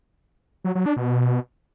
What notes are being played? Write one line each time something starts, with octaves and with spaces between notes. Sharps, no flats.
F#3
F#3
D4
B2